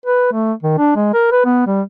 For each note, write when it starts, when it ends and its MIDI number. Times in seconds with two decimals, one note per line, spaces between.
0.06 0.30 71
0.32 0.53 57
0.63 0.74 51
0.78 0.93 62
0.96 1.09 56
1.14 1.29 70
1.32 1.43 71
1.45 1.66 59
1.67 1.82 55